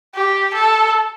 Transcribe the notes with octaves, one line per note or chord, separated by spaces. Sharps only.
G4
A4